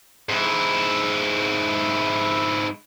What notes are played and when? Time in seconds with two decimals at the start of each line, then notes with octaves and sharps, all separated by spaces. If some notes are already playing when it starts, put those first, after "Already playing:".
0.29 G#2 E4